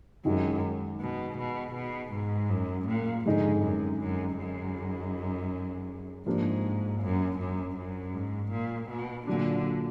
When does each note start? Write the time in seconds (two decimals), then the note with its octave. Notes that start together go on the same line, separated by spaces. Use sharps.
0.25 F#2 D#3 G#3 D#4 F#4
1.00 B2
1.38 B2
1.75 B2
2.13 G#2
2.50 F#2
2.88 A#2
3.26 F2 G#2 D3 G#3 D#4
3.64 F#2
4.00 F#2
4.38 F#2
6.26 G#2 F3 A#3 D4
7.02 F#2
7.39 F#2
7.77 F#2
8.14 G#2
8.52 A#2
8.90 B2
9.27 A#2 D3 F#3 D4